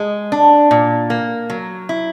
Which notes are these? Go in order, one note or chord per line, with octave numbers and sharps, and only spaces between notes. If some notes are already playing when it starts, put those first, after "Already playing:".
Already playing: G#3
D4
A#2
A#3
F#3
E4